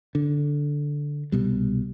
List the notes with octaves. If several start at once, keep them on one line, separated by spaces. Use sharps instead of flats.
D3
C2 B2 G3